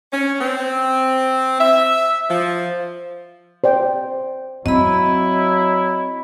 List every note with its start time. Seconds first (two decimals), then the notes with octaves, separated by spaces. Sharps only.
0.12 C#4
0.39 C4
1.60 E5
2.29 F3
3.64 C5 D5 G5
4.66 F#3 C4 E4 D#5 B5